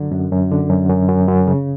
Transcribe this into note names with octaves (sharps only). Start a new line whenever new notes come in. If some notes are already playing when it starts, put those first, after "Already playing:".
Already playing: F#2 D3 F#3
F#2
F#2
D3
F#2
F#2
F#2
F#2
C#3